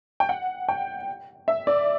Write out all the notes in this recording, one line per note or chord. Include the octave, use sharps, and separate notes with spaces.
G5
F#5
G5
E5
D5